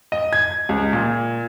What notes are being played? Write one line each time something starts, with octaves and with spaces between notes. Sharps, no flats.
D#5
G#6
C#2
A#2